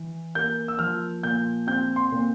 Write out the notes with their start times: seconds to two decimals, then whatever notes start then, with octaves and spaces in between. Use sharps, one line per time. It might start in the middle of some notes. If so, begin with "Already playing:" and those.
Already playing: E3
0.35 A#3 G6
0.68 E6
0.79 F3 F6
1.23 A#2 G6
1.67 C4 G6
1.96 C6
2.12 A#2